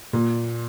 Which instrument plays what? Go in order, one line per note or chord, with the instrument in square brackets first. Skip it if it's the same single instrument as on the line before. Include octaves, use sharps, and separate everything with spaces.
[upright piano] A#2